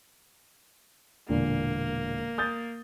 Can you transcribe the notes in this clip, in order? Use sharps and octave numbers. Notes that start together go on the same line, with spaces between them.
E1 A#2 D3 A#3
D#6 G6 A6